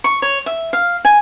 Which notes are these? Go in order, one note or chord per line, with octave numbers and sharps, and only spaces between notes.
C#6
C#5
E5
F5
G#5